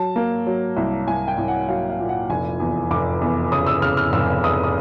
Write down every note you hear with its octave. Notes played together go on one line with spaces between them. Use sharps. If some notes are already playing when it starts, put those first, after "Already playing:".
Already playing: F#3 A5
A#3
F#3
C2
C2 G#5
G5
C2
F#5
F#3 F5
F5
A#2
F#5
F1 G#5
E2
F1 D6
E2
C#3 D#6
E6
C#3 F6
F6
F1 E6
F1 D#6
D#6